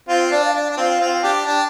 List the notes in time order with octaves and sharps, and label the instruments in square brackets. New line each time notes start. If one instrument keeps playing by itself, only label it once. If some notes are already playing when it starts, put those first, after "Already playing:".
[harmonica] C4 F4 [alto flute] F5
[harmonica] D4 [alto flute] D5
[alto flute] F5
[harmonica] D4 [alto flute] D5
[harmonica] D4
[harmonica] C4 F4 [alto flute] F5
[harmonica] C4 F4
[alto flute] G5
[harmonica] D4 G4
[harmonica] D4 [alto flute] G5